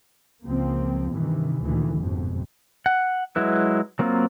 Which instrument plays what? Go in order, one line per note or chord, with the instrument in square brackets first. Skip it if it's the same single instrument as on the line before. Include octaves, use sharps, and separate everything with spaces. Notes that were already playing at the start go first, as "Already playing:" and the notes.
[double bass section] C#2 F3 A#3 C4
G2 C3 D#3 E3
D2 A#2 D#3 E3
G1 F2 G#2 B2
[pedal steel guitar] F#5
F#3 G#3 E4 B4
F#3 A#3 C4 F4